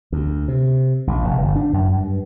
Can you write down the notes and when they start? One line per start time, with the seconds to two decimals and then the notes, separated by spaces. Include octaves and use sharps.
0.12 D2
0.48 C3
1.07 A#1
1.25 F1
1.42 G1
1.56 D4
1.73 F#2
1.97 G2